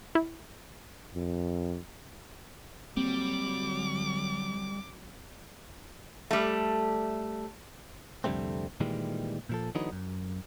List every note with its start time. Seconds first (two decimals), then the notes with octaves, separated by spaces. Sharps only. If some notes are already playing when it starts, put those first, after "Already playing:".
0.15 E4
1.15 F2
2.97 D3 F#3 G3 A#3 C4 D6
6.31 G3 A3
8.24 C2 F2 D3 G3 A3 C4
8.80 A#2 D#3 E3 G3 G#3
9.49 A#2 F3 A4
9.75 D3 E3 F#3 B3 D#4
9.92 F#2